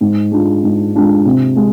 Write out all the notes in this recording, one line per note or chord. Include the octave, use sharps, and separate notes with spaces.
G#2
G#3 D4 F4
G#2
G#3 D4 F4
C3
G#3